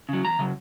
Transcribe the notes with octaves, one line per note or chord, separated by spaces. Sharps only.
C#3 F#3
E2 A#5
C#3 F#3